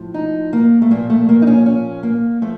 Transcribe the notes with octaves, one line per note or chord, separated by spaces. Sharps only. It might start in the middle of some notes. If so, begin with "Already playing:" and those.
Already playing: A2 F3
D#4
A#3
A3
A#2 F3 A#3
A3
A#3
D#4
C#4
C#4
A#3
F3 A3